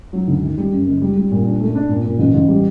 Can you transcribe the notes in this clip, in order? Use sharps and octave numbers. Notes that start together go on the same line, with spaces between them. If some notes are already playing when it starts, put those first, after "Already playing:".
F#3
D2
D#3
G3
F#2
F#1
G3
G3
A#2
D4
A3
D4
A#2
A#2
A1
A1
G3